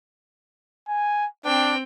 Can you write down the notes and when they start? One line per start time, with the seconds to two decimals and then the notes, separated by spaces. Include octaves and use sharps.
0.88 G#5
1.45 C4 D4 G5